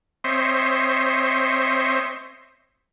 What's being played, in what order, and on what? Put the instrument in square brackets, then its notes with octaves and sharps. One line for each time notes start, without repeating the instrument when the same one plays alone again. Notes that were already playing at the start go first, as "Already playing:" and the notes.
[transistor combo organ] C4 C5 C#5 D#5 E5